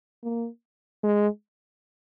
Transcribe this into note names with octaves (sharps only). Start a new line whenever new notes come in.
A#3
G#3